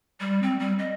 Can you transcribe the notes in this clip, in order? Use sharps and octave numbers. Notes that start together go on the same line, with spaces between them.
G3
C4
G3
D#5